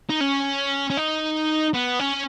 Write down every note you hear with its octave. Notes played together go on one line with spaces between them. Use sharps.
D#4
C#4
C#4
D#4
B3
C#4